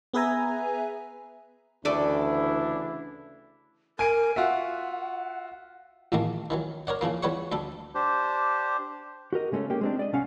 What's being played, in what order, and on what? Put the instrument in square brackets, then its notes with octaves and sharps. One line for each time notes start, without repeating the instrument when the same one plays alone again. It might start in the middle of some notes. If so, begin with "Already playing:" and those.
[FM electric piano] B3 G#4 B4 E5 G#5 A#5
[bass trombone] D2 [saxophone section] C#3 E3 D4 [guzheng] A3 A4 D5 [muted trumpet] E4
[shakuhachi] A#4 [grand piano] G#5 D7
[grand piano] F4 F#4 E5 [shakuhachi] F#5
[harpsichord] A1 E2 D#3 A3 A#3
D#3 E3 F#3
A#4 C#5 D5 F#5
C#3 E3 F3 A#3
E2 G3 B4 C#5 F#5 C#6
D2 G3 A4
[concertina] D4 G4 C5
[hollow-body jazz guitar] F#4 G4 A#4 D#5
C#3 G#3 A3 B3 C#4
A#3 C#4 G4
G#3 C4 D4
D5 D#5
C2 C#4 F5 F#5